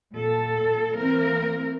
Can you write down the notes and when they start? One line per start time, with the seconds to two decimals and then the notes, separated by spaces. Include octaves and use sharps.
0.14 A#2 A4
0.95 E3 A#3 C4 A#4